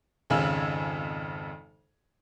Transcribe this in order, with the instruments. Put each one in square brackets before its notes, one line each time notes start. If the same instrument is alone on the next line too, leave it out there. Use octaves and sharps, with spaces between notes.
[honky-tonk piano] G#1 F2 C#3 G#5 E6 F#7